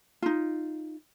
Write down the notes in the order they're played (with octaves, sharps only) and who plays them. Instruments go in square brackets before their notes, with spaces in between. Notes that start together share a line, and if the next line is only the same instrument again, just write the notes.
[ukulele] D#4 F4